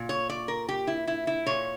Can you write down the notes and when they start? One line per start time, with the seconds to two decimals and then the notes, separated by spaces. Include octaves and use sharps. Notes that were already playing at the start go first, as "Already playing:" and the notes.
Already playing: A#2
0.09 C#5
0.30 D5
0.48 A#4
0.69 G4
0.87 E4
1.07 E4
1.27 E4
1.46 A#2 C#5